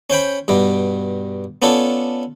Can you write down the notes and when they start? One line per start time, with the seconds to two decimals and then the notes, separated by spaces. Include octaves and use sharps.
0.10 C#4 C5 G5 B5
0.48 G2 B2 G3
1.62 B3 C#4 D4 F4 A4